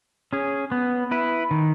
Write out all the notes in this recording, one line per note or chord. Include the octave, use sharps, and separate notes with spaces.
C#4 G#4
B3
E4 B4
D#3